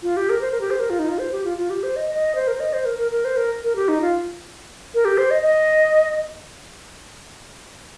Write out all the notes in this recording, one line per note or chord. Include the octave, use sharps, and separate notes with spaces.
F4
G4
A#4
C5
A#4
G4
C5
A#4
F4
D#4
F4
C5
G4
F4
F4
G4
C5
D#5
D#5
C5
A#4
C5
D#5
C5
A#4
A#4
A#4
C5
A#4
A#4
G4
D#4
F4
A#4
G4
C5
D#5
D#5